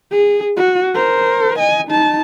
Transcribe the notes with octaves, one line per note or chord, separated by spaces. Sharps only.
G#4
F#4
A#4 C5
D#5 G#5
D#4 A5